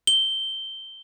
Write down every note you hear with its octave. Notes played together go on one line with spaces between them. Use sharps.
G7